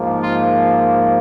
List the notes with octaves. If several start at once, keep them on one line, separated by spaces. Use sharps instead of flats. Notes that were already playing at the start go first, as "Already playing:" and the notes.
Already playing: G#2 F3 A#3
F4